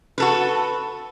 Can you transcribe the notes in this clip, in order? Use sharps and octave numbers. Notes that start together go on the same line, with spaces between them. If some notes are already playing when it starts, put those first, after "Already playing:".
F#4 A4 B4